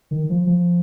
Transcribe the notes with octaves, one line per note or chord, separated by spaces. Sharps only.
D#3
F3
F3